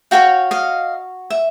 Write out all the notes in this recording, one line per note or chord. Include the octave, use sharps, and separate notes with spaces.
F#4 A4 C#5 F5 G5
D#5 F5
E5